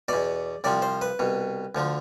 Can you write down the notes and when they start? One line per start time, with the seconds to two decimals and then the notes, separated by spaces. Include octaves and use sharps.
0.08 E2 B2 D5
0.64 C2 C3 F3 D5
0.82 C5
1.02 B4
1.19 C2 B2
1.75 D2 D3 F3